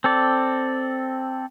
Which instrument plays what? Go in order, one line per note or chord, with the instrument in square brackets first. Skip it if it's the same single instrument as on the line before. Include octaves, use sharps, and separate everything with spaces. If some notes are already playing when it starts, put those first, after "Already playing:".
[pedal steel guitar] C4 A4 D5